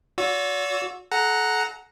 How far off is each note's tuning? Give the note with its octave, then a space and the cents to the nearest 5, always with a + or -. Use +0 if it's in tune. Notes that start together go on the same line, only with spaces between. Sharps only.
F#4 -35 D5 -45 E6 +0
A4 -35 F#5 +0 A#5 +0